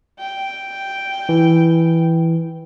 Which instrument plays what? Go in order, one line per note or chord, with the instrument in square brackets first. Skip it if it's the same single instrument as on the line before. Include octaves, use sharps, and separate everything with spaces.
[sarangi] G5
[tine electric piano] E3